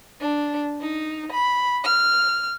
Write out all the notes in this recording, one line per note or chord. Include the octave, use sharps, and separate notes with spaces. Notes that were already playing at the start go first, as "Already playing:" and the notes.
D4
D#4
B5
F6